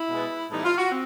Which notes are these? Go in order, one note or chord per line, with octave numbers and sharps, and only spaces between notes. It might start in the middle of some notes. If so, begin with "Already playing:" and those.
Already playing: E4
B2 G#3 B3
A2 E3 G3 B3 D#4
E4
F4
F#4
C4